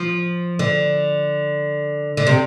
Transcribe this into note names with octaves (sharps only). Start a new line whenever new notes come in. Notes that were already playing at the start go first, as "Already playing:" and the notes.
Already playing: F3
D3
D3
C3